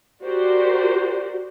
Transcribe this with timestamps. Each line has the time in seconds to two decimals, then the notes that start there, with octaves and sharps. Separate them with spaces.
0.23 F#4 G4 A#4 C5 D5